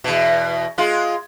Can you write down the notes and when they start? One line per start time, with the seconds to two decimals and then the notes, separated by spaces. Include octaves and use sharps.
0.04 E2 B2
0.78 G#3 F4